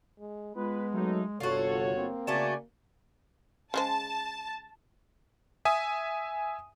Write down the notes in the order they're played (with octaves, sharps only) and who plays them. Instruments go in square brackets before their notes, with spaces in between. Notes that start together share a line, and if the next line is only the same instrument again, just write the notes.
[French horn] G#3
[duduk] G#3 [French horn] B3 [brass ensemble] F4 B4
[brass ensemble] F#3 A3 D#4
[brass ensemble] G1 C#5 [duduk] C3 [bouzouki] F4 F#4 [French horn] A4
[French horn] A#3 [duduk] C4
[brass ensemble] C#3 D5 G#5 [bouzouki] A3 F#4 A5
[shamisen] C#3 G#3 C5 [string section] A5
[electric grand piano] E5 G#5 D#6